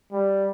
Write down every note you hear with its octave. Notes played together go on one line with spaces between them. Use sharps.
G3